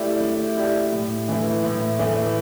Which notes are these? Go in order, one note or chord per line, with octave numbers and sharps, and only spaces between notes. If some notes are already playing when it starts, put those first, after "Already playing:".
Already playing: A3 E4 G4 D5
A3
E4 G4 D5
A2
E3 A3 E4
A2
E3 A3 E4